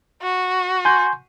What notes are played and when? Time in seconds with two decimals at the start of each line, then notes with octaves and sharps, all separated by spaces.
0.22 F#4
0.85 G#5 C6 G6